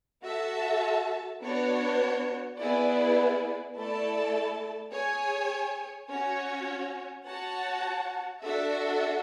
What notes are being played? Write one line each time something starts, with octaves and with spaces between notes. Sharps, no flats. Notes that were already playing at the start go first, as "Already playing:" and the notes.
F#4 A4 E5 A5
B3 D4 F#4 C#5
B3 E4 G#4 B4 D5
A3 E4 A4 D5 A5
G#4 C#5 G#5
C#4 F#4 C#5
F#4 C#5 F#5 A5
D4 F#4 A4 E5